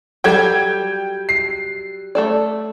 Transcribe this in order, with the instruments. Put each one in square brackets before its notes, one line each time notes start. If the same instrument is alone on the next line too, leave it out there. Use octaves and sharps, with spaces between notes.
[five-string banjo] F#3 G3 A4 [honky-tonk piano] G5 G#6
[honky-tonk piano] C7
[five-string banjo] A3 A4 D5